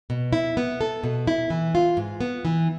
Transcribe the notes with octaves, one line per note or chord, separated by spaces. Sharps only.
B2
E4
B3
A4
B2
E4
E3
F4
G#2
B3
E3